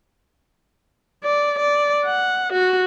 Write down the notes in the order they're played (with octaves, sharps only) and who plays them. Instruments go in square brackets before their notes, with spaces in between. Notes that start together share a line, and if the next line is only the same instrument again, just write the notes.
[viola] D5
D5
F#5
F#4